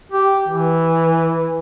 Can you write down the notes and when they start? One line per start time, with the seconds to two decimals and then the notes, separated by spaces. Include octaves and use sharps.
0.12 G4
0.48 E3